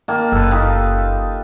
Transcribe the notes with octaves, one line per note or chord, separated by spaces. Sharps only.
D#3 A#3 A5
F#1 A4 B4
D#4 F4 G4